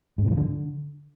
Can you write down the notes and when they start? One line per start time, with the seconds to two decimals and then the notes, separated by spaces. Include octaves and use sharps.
0.18 G#2
0.25 C3
0.31 F3
0.37 D3